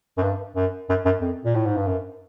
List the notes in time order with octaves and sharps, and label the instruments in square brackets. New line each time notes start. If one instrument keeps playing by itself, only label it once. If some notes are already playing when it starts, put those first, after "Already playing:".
[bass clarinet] F#2
G2
F#2
F#2
F#2
F2
A#2
A2
G#2
G2
F#2